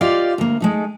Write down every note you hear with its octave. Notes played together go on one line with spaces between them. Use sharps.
F4 G4 D5 D#5 F5
D2 A#3
G#3 A3 D#4